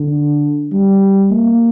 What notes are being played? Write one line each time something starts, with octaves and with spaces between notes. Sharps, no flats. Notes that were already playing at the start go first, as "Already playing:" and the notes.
Already playing: D3
G3
A#3